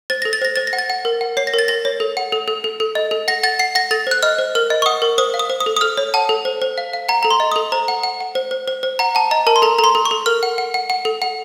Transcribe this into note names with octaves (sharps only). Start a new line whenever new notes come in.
C5 A6
A4 A#6
A6
C5 A#6
C5 A6
A#6
F#5
A6
F#5
A#4
F#5
C#5 C7
A#6
A#4 A6
A#4 A#6
C#5
A4
F#5
A4
A4
A4
A4
D#5
A4
F#5 A#6
F#5 A6
F#5 C7
F#5 A#6
A4 A6
C5 F#6
D#5 F6
C5
A#4 F6
D#5
C#6
F#5 D#6
A#4
C5 D#6
F5
D#6
C5
D#6
A4
D#6
A4 F6
C#5
F#5 A5
A4
C5
C5
F5
F5
F#5 A#5
A4 A#5
C6
D#5
D#6
A4
C5 A#5
F#5
F#5
F#5
C5
C5
C5
C5
F#5 A#5
F#5 A5
D#5 A#5
A#4 A5
C6
A4 A#5
A4 A#5
C6
A4
C#6
A4
A#4 F6
F#5
F#5
F#5
F#5
A4
F#5